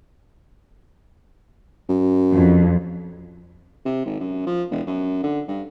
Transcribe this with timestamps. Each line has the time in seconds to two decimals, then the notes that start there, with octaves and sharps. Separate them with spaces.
1.89 F#2
2.32 F2
3.86 C3
4.06 G#1
4.20 F#2
4.47 F3
4.71 E1
4.87 F#2
5.24 D3
5.48 G2